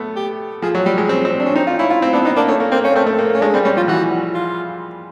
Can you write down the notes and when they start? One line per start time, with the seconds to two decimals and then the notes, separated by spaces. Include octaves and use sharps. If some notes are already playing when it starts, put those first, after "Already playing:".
Already playing: A3 B3
0.16 G4
0.62 F3 G#4
0.75 F#3
0.86 G3 G4
0.98 G#3
1.09 C4 C#4
1.25 C4
1.40 D4
1.46 C#4
1.56 C4 D#4
1.67 F4
1.79 C#4 E4
1.90 F4
2.02 C4
2.13 B3 D4
2.25 B3 D#4
2.37 A#3 D4
2.48 A3 C#4
2.60 A#3
2.71 A#3 C4
2.84 A#3 C#4
2.96 A3 C4
3.06 A3
3.19 A#3
3.30 A#3
3.34 C#4
3.42 G#3 D4
3.54 G3 C4
3.65 G3 C#4
3.77 F3 F4
3.88 E3 F#4
4.34 F4